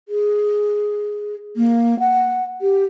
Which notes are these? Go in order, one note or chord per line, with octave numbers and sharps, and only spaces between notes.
G#4
A#3
F#5
G4